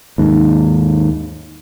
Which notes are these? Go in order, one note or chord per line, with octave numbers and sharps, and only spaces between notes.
D#2 G#2